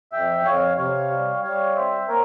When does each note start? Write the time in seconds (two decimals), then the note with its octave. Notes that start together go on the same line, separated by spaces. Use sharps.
0.12 F2 E5 G5
0.45 F2 C#5 F5
0.77 C3 C#5 F5
1.10 G3
1.43 G3 C#5 F5
1.75 C4 C5 E5
2.08 A#3 A#4 C#5